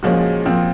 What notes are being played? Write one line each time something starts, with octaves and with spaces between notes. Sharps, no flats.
A#2 F3 G#3 C#4 F#4
A#2 F3 C4